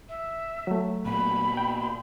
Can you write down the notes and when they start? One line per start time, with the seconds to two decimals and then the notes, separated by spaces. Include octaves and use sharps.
0.09 E5
0.67 F#3 A3
1.05 A#2 B3 B5
1.57 G5